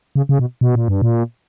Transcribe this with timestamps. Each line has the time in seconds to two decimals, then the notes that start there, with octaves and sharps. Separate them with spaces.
0.16 C#3
0.29 C#3
0.39 B2
0.61 B2
0.75 A#2
0.88 G2
1.02 A#2